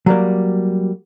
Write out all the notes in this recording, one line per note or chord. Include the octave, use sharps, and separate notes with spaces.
F#3 G3 A#3